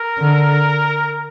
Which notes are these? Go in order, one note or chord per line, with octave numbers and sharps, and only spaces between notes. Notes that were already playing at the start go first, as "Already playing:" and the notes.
Already playing: A#4
D3